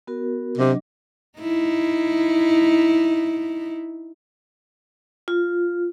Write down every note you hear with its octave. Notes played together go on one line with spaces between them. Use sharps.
B3 F#4 A#4
C3 F#3 D4 D#5
D#4 E4
F4